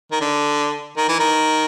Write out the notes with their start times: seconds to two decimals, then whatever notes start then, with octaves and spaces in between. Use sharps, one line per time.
0.12 D#3
0.21 D3
0.97 D#3
1.09 E3
1.19 D#3